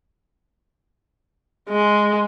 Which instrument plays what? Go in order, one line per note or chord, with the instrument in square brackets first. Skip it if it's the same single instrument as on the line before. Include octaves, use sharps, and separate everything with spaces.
[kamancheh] G#3